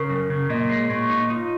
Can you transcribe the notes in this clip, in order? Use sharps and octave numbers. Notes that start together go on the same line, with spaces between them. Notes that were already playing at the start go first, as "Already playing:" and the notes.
Already playing: C#3 A#4 C#5
F#2
C#3
A#2 D#5
G#3
A#2 C#5
D#4
D#4 F4